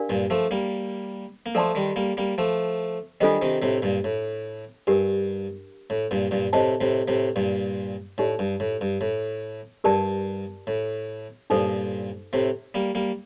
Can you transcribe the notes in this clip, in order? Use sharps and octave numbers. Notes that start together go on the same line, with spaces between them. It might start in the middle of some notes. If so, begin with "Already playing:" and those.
Already playing: D4 G4 A#4 D5 F5
G2 A#2
F3 A3
G3 A#3
A#3
F3 A3 A4 D5 A5 C6
D#3 G3
G3 A#3
G3 A#3
F3 A3
D#3 G3 D4 F4 A4 C5 D#5
C3 D#3
A2 C3
G2 A#2
A2
G2 D4 G4 A#4
A2
G2 A#2
G2 A#2
A2 C3 C5 D#5 A5
A2 C3
A2 C3
G2 A#2
A2 D#4 G4 D5
G2
A2
G2
A2
G2 G4 A#4 D5 A5
A2
G2 A#2 D#4 A4 C5
A2 C3
G3 A#3
G3 A#3